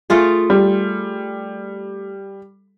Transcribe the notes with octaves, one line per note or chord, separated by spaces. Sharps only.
A3 F4 G#4
G3